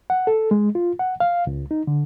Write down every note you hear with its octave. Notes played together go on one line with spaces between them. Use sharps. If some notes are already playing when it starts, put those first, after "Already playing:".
F#5
A4
G#3
F4
F#5
F5
C#2
D#4
D3